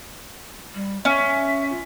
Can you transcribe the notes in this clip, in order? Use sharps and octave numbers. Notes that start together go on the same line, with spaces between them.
G3
C#4 E5
F4